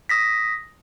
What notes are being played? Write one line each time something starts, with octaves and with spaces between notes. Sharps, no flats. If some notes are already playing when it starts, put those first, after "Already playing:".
D#6 A#6 B6